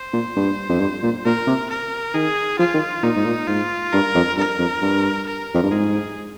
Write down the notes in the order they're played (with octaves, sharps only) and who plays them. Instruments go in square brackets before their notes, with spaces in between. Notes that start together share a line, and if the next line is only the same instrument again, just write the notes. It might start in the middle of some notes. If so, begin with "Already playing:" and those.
Already playing: [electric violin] C5
[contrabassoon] A#2
G2
F2
G2
A#2
[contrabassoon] A#2 [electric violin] A#4
[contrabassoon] C3
[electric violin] A#4
[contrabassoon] D#3 [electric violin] G#4
[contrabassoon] F3 [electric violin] F4
[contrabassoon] D#3
[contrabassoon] A#2 [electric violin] D#4
[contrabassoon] G#2
A#2
[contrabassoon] G#2 [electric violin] F4
[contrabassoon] G2 [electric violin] A#4
[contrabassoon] F2
[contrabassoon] G2 [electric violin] A#4
[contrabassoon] F2
G2
[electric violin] A#4
[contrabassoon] F2
G2
[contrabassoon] G#2 [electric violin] G#4